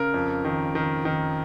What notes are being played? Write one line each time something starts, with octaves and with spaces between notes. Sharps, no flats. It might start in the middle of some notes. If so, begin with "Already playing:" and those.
Already playing: C#3 A#4
F2
D#3
D#3
D#3